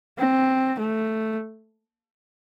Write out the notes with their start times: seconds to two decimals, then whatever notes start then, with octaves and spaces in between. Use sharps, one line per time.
0.18 C4
0.80 A3